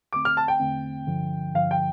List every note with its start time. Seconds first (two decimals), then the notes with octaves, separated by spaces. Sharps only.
0.13 E2 D3 A3 C4 D6
0.25 F6
0.37 A5
0.48 G5
0.60 E2 D3 A3 C4
1.07 G2 D3 F3
1.54 G2 D3 F3 F5
1.71 G5